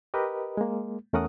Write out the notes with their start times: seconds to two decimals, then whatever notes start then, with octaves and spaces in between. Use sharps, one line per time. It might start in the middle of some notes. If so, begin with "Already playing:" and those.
0.14 G4 A#4 B4 D#5
0.57 G#3 A#3
1.13 E2 A3 C#4 A#4 F#5 D#6